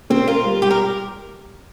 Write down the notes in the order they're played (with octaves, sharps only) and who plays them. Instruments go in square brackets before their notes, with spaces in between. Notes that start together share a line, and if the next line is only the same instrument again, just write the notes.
[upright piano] A#3 [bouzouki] C4
[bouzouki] F4 [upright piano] A#4
[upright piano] G3
[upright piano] G3 [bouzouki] G4
[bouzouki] A#4